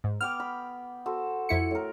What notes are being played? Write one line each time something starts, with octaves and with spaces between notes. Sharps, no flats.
G#2
B3 G5 D6 F6
B5
F#4 A4 C5
F2 E4 C#7
A2 A#4